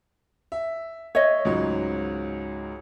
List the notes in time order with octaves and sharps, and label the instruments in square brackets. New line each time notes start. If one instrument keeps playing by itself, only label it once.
[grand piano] E5
[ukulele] C#5 D#5 [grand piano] E5
[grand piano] C#2 G#2 F#3